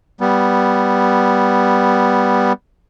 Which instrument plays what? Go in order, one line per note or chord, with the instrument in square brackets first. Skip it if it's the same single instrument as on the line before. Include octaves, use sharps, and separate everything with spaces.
[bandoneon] G3 B3